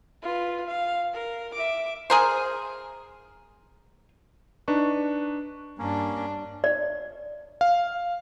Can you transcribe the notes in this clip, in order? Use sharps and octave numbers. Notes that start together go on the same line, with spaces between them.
F4 B4
F5
A#4
E5 D6
G#4 A#4 C5
D4 D#4 B4 C#6
G2 A#3 C#4 D4
D5
F5